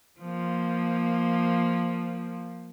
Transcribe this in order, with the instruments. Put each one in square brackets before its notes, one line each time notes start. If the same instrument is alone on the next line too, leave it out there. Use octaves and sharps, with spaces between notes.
[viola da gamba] F3 A#3